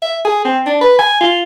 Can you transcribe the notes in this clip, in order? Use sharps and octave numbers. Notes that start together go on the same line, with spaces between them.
E5
G#4
C4
D4
B4
G#5
F4